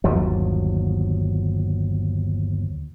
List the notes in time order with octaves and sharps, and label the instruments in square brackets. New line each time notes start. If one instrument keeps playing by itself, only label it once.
[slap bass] G1 D#2 F3 F#3